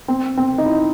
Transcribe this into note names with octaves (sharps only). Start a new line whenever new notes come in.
C4
C4
D#4
E4